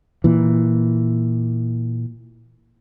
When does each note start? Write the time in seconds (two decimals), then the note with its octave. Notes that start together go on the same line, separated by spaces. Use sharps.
0.24 A#2 E3